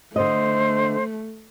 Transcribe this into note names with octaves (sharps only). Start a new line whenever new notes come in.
D3 A3 C5 D#5